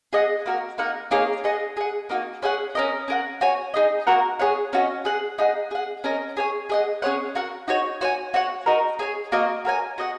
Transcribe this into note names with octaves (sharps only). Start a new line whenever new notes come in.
G#4 D#5 F#5
A#3 F#4 A#4
A#3 D#4 A#4 F#5
A#3 D#4 G#4 C#5
G#4 D#5 F#5
G#4 F#5
A#3 D#4 F#4
C#4 G#4 F#5
C#4 A#4 D#5
C#4 A#4 F#5
F#4 C#5 G#5
D#4 G#4 D#5
A#3 F#4 A#4 F#5
G#4 C#5 F#5
C#4 F#4 D#5
G#4 F#5
D#4 G#4 F#5
G#4 F#5
C#4 A#4 D#5
G#4 C#5 G#5
G#4 D#5 F#5
C#4 G#4 C#5 F#5
F#4 A#4 F#5
D#4 F#4 C#5
F#4 C#5 G#5
F#4 C#5 F#5
D#4 F#4 A#4
G#4 C#5 G#5
A#3 F#4 A#4 D#5
F#4 A#4 C#5 G#5
F#4 D#5 F#5